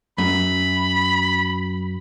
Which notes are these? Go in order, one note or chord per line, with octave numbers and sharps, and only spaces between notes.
F#2 B5